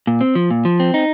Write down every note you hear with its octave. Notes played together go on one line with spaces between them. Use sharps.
A#2
C4
F3
A#2
F3
C4
D#4